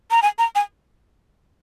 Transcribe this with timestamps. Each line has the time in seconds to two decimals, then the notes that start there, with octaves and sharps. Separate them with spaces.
0.11 A#5
0.22 G#5
0.39 A#5
0.55 G#5